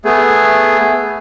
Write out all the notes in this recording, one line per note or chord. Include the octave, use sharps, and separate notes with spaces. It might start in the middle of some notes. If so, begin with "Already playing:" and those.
A3 B3 G#4